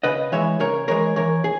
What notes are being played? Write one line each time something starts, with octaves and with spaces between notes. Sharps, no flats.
C#3 B4 D#5
E3 G#3 C#5 E5
C#3 A#4 C#5
E3 G#3 A#4 C#5
E3 A#4 C#5
G#4